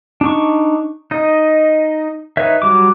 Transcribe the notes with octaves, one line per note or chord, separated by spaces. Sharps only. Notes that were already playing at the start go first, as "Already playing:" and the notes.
D4 D#4 C#6
D#4 D#5
D#4 B4 C#5 E5
F#3 G3 D6